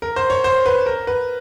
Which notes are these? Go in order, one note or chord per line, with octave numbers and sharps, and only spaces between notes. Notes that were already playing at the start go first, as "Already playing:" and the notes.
A#4
C5
C#5
C5
B4
A#4
B4